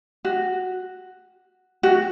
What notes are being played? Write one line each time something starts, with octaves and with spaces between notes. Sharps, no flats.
F#4
F#4